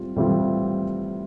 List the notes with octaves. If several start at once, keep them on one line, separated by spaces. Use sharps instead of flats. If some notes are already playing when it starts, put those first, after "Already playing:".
Already playing: A2 G3 C4 F4
A2 E3 G3 C4 F4